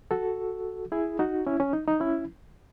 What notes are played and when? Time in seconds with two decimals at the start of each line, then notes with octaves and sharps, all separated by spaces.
0.11 F#4 A4
0.92 E4 G#4
1.19 D#4 F#4
1.47 C#4 E4
1.60 C#4
1.73 D#4
1.87 D#4
2.00 C#4 E4